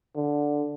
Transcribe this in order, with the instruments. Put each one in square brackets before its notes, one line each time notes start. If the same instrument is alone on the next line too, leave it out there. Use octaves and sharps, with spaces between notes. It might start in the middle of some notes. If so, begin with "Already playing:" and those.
[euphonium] D3